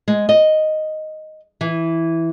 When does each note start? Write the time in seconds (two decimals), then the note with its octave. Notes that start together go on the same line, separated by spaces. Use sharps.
0.08 G#3
0.29 D#5
1.61 E3